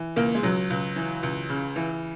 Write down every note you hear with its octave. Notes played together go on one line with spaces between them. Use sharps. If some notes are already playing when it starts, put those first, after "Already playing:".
Already playing: E3
C#2 A#3
G#3
C#2 F#3
C#2
E3
C#2
C#3
E3